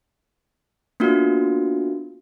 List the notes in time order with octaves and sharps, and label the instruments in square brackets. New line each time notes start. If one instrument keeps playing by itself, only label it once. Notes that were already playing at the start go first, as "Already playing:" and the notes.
[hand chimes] A#3 B3 D4 F4 F#4